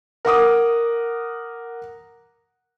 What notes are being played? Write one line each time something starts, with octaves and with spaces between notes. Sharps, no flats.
A#4 F#5 D6 D#6